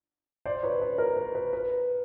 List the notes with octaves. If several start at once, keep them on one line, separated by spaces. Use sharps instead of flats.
C5 D5
B4 C#5
B4
A#4
B4
B4
B4